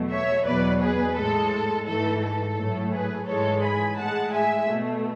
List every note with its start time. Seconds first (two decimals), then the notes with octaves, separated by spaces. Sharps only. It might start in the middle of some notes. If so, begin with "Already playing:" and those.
Already playing: E2 B2 F#3 A3
0.10 C#5 E5
0.45 E2 B2 F#3 B4 D5
0.80 G#4 B4
1.16 A2 G#3 A4
1.86 G#2 E3 A3 A4
2.22 A4
2.57 A2 F#3 A3
2.92 G#4 B4
3.27 G#2 E3 G#3 A4 C#5
3.62 G#5 B5
3.98 A2 G#3 F#5 A5
4.33 E5 G#5
4.68 B2 A3